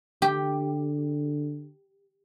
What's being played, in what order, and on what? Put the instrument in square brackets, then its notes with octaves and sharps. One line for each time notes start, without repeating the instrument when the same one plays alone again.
[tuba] D3 [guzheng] G4